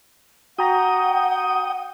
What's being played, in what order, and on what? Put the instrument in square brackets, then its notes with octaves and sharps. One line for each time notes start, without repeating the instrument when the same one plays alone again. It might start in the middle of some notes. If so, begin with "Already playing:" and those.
[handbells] F#4 A#5 A#6 [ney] F#5 [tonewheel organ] G5 D#6